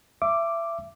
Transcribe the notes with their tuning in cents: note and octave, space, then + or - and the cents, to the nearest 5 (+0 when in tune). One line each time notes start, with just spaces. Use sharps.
E5 +25 D6 +0